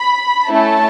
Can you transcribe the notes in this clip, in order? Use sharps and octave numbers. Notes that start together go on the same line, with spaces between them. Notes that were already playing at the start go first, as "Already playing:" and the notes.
Already playing: B5
A3 C#4 E4 A5